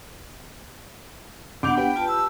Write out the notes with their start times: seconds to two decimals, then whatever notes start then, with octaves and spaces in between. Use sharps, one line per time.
1.63 C2 B3 D4 F#5 D6 G6
1.77 G4 B4 G5
1.96 F4 A5
2.08 A5 E6